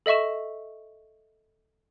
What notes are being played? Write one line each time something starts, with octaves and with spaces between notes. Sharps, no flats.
A4 D#5 E5 C#6 E7